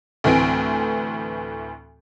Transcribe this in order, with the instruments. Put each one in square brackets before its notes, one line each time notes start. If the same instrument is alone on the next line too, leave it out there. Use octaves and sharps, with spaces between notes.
[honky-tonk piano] D2 A2 E3 C4 G#5 D7